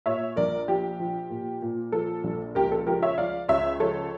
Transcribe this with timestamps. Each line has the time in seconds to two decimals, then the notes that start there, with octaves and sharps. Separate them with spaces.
0.06 A#2 C#5 E5
0.36 A#1 A#4 D5
0.68 F3 G4
1.00 F3
1.30 A#2
1.62 A#2
1.92 F3 A4
2.24 A#1
2.55 C#2 G4 A#4
2.72 A4
2.87 F3 G4 A#4
3.03 C#5 E5
3.18 F3 D5 F5
3.48 C#2 C#5 E5
3.80 F3 A4 C#5